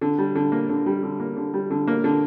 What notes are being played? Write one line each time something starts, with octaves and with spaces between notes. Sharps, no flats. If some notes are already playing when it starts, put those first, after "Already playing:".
D3
G3
D3
A#3
D3
G3
D3
A#3
D3
G3
D3
A#3
D3